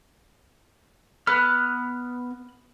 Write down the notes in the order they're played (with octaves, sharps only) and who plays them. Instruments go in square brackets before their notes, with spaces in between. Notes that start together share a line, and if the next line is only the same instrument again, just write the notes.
[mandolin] B3 [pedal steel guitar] F6 F#6